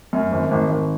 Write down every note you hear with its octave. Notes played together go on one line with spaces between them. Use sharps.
F#2
G#1
G#1
G#1